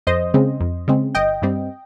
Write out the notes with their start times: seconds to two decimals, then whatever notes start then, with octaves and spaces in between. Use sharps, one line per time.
0.07 F2 C5 D#5
0.34 C#3 G#3 C4
0.60 F2
0.88 C#3 G#3 C4
1.15 G1 D#5 G5
1.42 G2 G3 C4